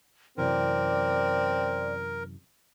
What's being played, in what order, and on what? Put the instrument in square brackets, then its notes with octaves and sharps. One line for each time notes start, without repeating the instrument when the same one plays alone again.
[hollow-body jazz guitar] F#2 C3 E3 [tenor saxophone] C4 [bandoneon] A#4 [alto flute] D5